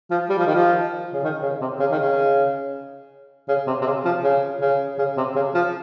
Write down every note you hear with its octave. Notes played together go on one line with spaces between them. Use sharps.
F3
G3
F3
D#3
F3
C#3
D#3
C#3
C3
C#3
D#3
C#3
C#3
C3
C3
C#3
F3
C#3
C#3
C#3
C3
C#3
F3